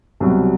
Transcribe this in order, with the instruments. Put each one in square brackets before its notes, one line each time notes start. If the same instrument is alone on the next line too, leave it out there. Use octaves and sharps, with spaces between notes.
[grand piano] C2 B2 F#3